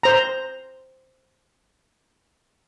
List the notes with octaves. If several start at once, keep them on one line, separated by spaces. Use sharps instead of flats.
C5 A#5